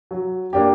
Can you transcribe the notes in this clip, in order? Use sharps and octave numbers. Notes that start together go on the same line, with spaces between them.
F#3
A#3 D4 G4